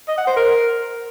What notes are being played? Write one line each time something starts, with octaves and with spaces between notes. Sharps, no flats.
D#5
F#5
C5
A#4